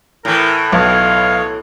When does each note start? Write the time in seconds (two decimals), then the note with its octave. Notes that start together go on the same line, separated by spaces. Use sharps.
0.25 A2 E3 A#4
0.72 B1 C#5 D#5 F5